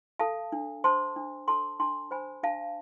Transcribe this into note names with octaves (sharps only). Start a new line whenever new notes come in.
A4 F5 A5
D4
C5 A5 C6
D4
A4 A5 C6
D4 A5 C6
C5 G#5 B5
D4 F5 A5